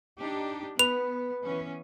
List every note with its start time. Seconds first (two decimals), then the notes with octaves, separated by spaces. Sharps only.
0.20 D4 D#4 G4
0.79 B3 B4 F7
1.43 E3 B3 C#4